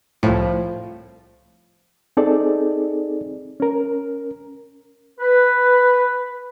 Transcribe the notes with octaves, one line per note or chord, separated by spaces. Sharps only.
C2 A2 F3
C4 D#4 G#4 A4 D5
C#4 A#4
B4